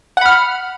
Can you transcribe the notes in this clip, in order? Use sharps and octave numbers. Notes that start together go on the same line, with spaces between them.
F#5 B5 F6